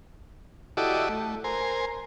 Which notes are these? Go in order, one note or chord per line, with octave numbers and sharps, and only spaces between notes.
E4 F#4 G4 A4 D5 D#5
A3
A#4 C5 G#5